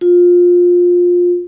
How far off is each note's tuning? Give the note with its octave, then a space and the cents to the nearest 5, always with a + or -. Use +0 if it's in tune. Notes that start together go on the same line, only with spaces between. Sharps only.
F4 +20